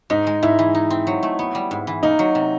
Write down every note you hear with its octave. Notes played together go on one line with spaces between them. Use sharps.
G#2 D#4
G#3
G#2 E4
E3
D#4
C4
F#3
A3
B3
G3
G#2
E3
A#3 D#4
F#3
C3